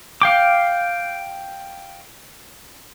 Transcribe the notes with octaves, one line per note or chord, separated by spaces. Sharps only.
F5 G5 D6